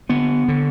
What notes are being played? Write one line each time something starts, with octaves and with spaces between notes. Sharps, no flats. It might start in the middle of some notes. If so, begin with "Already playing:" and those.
D3 B3
D3